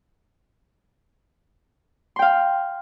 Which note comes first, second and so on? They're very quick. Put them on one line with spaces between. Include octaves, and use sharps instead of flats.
C6 G5 F5